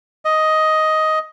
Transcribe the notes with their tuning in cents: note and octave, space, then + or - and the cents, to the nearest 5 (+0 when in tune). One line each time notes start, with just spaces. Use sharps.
D#5 +10